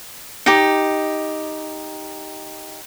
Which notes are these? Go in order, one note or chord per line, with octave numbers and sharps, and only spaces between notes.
D#4 G4